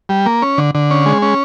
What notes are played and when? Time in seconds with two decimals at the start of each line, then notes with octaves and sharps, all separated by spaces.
0.09 G3
0.26 A#3
0.42 C#4
0.58 D3
0.75 D3
0.91 C#4
1.06 G#3
1.22 C#4